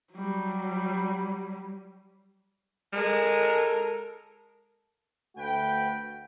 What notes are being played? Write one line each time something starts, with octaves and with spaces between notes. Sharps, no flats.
F#3 G3
G#3 A4 A#4
D2 A3 F#4 B4 G5